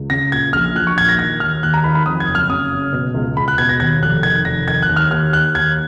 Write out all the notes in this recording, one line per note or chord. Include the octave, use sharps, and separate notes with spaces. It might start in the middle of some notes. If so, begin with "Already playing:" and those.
Already playing: C#2
C#3 A#6
A#2 G#6
A#1 F6
A#1 F#6
C#6
A#2 G#6
A#6
D#3 G#6
D#2 F6
D#2 F#6
A#5
D#3 B5
B5
F2 D#6
G#6
F#1
F6
C#3 D#6
F#1
B2
C#2
C#2 B5
F#6
B2 G#6
A#6
D#2 G#6
F1 F#6
D#3 G#6
F1 A#6
D#3 G#6
F#6
D#2
F6
D#2 F6
D#3 F#6
D#2 G#6